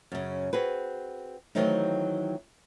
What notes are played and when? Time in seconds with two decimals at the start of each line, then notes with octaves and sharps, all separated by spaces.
0.12 F#2 C#3
0.53 C4 F#4 G#4 B4
1.55 D#3 E3 F#3 A3 C4 D#4